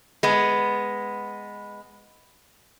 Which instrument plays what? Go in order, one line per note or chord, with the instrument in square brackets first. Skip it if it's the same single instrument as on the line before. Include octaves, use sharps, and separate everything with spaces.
[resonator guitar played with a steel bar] G#3 B3